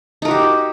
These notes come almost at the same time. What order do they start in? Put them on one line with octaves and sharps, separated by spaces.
D#4 A#4 F#4 G4